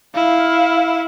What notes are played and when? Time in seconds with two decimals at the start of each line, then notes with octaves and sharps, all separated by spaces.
0.14 E4 F5